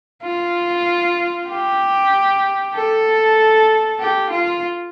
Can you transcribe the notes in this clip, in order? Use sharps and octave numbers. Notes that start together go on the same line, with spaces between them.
F4
G4
A4
G4
F4